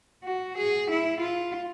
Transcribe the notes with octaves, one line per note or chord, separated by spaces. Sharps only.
F#4
G#4
E4
F4